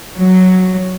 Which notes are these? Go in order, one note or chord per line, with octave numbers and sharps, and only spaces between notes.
F#3